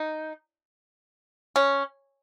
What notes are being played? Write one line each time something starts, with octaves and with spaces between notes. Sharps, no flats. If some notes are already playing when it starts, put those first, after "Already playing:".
Already playing: D#4
C#4